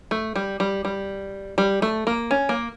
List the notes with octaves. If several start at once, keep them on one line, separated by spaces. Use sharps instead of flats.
A3
G3
G3
G3
G3
A3
A#3
C#4
A#3